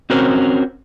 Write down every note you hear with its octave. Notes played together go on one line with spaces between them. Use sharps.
C4 C#4 F#4 A#4 C5